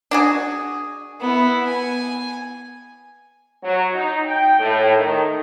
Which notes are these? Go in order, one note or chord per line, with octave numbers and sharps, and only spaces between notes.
D4 F#4 G#4
B3 E4
G#5
F#3
D#4
G5
A2
D#3